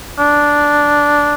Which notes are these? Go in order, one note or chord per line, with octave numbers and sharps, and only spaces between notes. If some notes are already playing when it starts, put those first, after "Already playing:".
D4